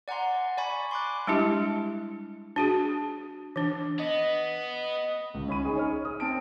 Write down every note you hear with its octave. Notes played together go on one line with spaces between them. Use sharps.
D5 F#5 G#5 A#5 C6
D5 G#5 B5 C#6
C6 D6 F#6
G3 G#3 D4 E4 G4
D4 F#4 G#4
E3 D4
B3 D#5
C#2
C#4 B5 D#7
D#4 G#4
C#5 F6
D#6
C4 A5 D7